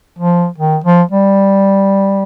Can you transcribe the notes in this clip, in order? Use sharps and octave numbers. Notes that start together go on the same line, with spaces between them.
F3
D#3
F3
G3